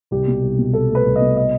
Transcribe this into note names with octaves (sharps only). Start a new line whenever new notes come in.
C2 G4
B2
C2
B2
C2 A4
A3 B4
C2
D#5
B2
D#5